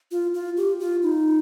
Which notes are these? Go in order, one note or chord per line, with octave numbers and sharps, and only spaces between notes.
F4
F4
G4
F4
D#4